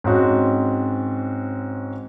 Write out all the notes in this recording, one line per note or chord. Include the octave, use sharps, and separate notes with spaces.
G#2 C4 C#4 F#4